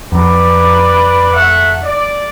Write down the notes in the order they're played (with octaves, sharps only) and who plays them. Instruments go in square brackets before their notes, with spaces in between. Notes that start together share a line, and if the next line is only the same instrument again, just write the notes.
[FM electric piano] F2 A#5 [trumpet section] B4 D5
[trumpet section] A3 E5 F#5
D5